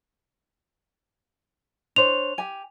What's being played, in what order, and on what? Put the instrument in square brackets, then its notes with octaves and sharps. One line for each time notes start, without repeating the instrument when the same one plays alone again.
[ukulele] D4 C5 C#5 [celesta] F7
[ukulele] G4 G#5